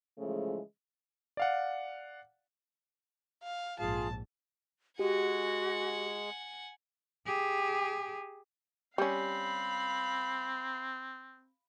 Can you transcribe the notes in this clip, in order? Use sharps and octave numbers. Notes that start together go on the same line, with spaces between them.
C#3 E3 F3 G#3 A3
D5 F5 F#5
F5
A#1 G#2 F4 G#4 F5 A5
G#3 F#4 G4 F#5 G#5
G4 G#4
G3 C4 C#4 F5 B5